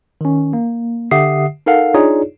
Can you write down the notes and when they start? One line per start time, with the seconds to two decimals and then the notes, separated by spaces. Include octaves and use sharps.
0.21 D#3 C#4
0.53 A#3
1.11 D3 G4 E5 F#5 D#6 C7
1.66 D#4 A4 A#4 F5 F#5
1.94 D4 D#4 F4 G#4 C#5 D5